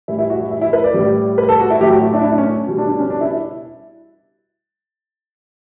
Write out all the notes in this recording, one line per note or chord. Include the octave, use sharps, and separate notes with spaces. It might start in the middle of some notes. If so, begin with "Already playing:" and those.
A2 E3 G3 E4
E4
F#4
E4
E4
E4
B4
D5
A2 G3
B4
A4
F#4
E4
A2 F#3 A3 G4
F#4
E4
D4
E4
D4
C#4
B2 G3
D4
D4
C#4
D4
E4
E4